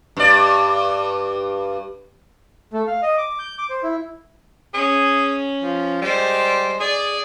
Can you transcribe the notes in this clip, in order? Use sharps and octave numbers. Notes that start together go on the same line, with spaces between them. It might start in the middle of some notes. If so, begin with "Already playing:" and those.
G2 D5
A3
F5
D#5
D6
G6
D6
C5
E4
C#4 G#4
F3
G3 G#3 C5
G#4 D5